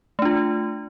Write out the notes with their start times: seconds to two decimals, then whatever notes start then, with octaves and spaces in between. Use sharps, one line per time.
0.19 A3
0.22 D4
0.25 F4